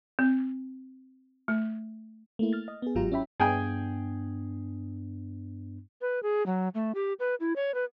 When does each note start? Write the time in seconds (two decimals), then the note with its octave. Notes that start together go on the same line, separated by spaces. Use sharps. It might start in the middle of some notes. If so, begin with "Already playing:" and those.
0.19 C4
1.48 A3
2.39 A3 A#3 E4
2.53 F6 A6
2.68 D#5
2.82 B3 G#4
2.95 G1 G#2 F#3 F4 G4 A#5
3.12 C#4 E4 C#5 E5 G5 B5
3.40 G2 B3 D4 G#4 G5 G#5
6.01 B4
6.23 G#4
6.46 F#3
6.75 A3
6.95 G4
7.20 B4
7.40 E4
7.56 C#5
7.74 B4